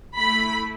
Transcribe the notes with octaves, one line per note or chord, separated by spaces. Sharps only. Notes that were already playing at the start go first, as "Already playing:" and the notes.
A3 E4 B5